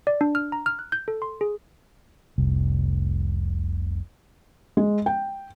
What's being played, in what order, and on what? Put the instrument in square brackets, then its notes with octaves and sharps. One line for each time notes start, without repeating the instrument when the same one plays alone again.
[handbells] D5
D4
F6
A#5
F6
F#6
G6
A4
C6
G#4
[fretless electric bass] F1 C2
[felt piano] G#3
G5